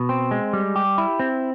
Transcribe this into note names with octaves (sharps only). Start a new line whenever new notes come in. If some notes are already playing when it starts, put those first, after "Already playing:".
Already playing: B2
C4
G#3
G3
G4
E4
C4